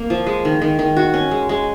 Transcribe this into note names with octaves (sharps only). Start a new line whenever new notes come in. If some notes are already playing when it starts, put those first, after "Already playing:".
Already playing: A#3
F3
G#3
D#3
D#3
D#3
F#4
C#4
G#3
G#3